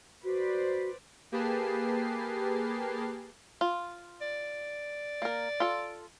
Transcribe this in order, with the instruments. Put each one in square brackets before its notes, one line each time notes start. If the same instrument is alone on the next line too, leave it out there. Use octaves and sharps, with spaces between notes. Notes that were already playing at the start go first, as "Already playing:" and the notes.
[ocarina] F#4 [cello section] B4 C5 D5
[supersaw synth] A#3 G4 G#4 B4 A5 C7
[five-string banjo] F4
[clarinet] D5
[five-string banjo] A#3 A#4
F4 A4